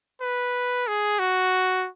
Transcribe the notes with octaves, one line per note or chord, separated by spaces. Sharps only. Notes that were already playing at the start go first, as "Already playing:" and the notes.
B4
G#4
F#4